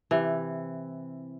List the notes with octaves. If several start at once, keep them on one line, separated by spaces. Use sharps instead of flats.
C3 E3